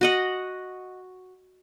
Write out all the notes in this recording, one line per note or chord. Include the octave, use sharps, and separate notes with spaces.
F#4 D#5 F#5